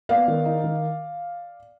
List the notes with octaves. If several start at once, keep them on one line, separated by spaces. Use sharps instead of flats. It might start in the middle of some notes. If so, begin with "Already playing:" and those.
B3 D5 F5
D#3
D#4
D#3